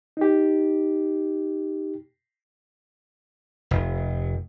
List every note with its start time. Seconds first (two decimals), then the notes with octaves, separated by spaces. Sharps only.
0.17 D#4 G4
3.71 F1